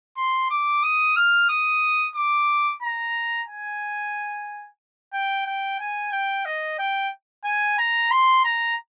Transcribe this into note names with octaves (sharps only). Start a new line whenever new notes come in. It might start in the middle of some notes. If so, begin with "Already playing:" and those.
C6
D6
D#6
F6
D#6
D6
A#5
G#5
G5
G5
G#5
G5
D#5
G5
G#5
A#5
C6
A#5